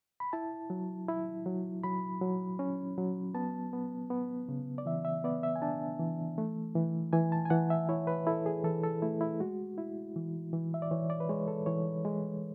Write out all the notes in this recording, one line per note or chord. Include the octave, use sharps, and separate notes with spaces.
B5
E4 A5
F#3
E4
F#3
F#3 B5
F#3
C#4
F#3
B3 A5
B3
B3
C#3
D5
E3 E5
E5
B3 D5
E5
G#5
D4 A5
E3
A3
E3
E3 G#5
A5
G#5
E3 F#5
E5
E4 C#5
B4
E4 A4
G#4
E3 A4
A4
A3 E4
E4
G#3 F#4
E4
E3
E3
E5
D5
E3 C#5
D5
B4
G#3 C#5
A4
E3 C#5
G#3